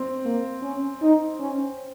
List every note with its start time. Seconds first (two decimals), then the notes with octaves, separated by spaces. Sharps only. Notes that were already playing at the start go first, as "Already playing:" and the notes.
Already playing: C4
0.25 A#3
0.63 C#4
1.02 D#4
1.40 C#4